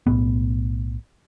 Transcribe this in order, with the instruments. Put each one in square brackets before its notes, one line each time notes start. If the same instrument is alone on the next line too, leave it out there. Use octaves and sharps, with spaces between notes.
[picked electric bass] B1 E2 A2 B3